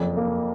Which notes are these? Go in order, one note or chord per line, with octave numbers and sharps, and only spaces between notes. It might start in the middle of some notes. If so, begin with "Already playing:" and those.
Already playing: F#1 F2
A#3